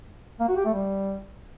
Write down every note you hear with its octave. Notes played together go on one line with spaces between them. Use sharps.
A#3
F#4
G4
A3
G3